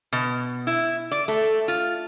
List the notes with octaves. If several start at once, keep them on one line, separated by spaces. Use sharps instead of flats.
B2
E4
D5
A3
F4